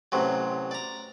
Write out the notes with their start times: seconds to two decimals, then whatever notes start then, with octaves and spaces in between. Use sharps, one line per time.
0.12 A1 C3 F#3
0.71 D5 A#5